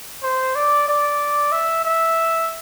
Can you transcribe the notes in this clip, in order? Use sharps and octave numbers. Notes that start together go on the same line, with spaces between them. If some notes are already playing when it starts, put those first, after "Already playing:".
C5
D5
D5
E5
E5